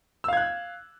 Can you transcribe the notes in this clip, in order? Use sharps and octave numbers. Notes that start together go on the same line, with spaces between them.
F5 E6 F#6 G#6